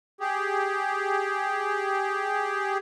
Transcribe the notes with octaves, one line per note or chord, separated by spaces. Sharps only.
G4 G#4